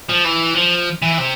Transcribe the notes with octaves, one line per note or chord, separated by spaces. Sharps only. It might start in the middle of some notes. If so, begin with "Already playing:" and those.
F3
E3
F3
E3
C3